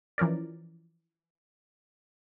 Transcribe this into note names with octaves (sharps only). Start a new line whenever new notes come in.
E3 F3 C#4 A#4 D5